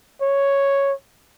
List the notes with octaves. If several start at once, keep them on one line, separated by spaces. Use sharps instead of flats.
C#5